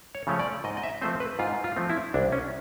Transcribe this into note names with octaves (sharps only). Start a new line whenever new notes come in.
C#5
C#3 F3 A3 C#4
D5
G#2 D#5
D#5
E5
F3 A3 C4 C5
B4
G#2 F4
F4
F3 A3 C4
E4
C2 D4
C#4